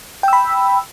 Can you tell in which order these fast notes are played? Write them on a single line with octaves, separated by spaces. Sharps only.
G5 E6 B5